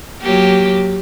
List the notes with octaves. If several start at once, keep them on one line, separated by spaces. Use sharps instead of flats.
F#3 A#3 G4